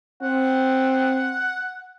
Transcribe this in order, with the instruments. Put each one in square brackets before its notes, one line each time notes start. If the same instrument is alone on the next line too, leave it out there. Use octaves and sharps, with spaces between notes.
[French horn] C4 [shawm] F#5